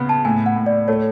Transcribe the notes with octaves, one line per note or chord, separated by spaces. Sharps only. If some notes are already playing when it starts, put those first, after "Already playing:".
Already playing: C#3 B3
A5
A2 G#5
F#5
A2
D5
A3 C#5